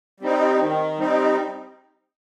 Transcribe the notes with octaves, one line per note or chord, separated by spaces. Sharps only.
G3 C4 D#4
D#3
G3 C4 D#4